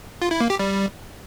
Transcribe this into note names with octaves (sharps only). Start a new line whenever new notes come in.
F4
E4
A#3
G4
G3